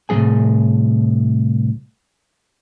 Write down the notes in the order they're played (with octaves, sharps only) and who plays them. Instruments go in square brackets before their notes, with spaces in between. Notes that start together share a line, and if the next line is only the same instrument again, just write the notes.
[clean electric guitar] C2 A2 D#3 A#3 G#4 G#5